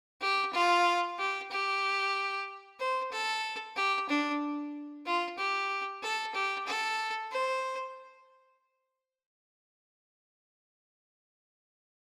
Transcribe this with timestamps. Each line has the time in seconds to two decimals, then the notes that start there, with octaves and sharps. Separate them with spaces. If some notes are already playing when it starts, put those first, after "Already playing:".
0.21 G4
0.53 F4
1.18 G4
1.51 G4
2.79 C5
3.11 A4
3.76 G4
4.09 D4
5.05 F4
5.37 G4
6.03 A4
6.35 G4
6.67 A4
7.31 C5